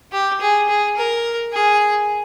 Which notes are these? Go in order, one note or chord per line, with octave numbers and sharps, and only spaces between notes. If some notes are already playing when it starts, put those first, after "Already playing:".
G4
G#4
G#4
A#4
G#4